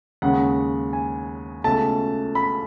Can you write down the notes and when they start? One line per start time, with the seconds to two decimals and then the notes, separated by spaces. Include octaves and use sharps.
0.22 D#2 C#3 G#3 F#5
0.93 G#5
1.64 C#2 B2 A3 A5
2.35 B5